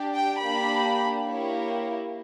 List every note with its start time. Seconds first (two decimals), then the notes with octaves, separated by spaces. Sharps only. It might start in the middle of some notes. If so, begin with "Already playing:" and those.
Already playing: D4 G4
0.14 G5
0.41 A#3 D4 G4 B5
1.27 A#3 E4 G4 C#5